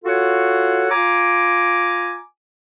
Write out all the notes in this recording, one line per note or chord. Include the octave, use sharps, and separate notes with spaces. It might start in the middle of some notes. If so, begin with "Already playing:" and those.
F4 F#4 A4 C#5 F#5
F4 G#5 A#5 D6